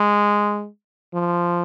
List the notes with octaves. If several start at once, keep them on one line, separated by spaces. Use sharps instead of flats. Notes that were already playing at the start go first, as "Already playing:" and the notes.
Already playing: G#3
F3